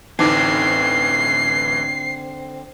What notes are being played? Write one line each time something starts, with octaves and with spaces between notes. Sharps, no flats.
A1 D2 D3 E3 C4 D#4 D6 C7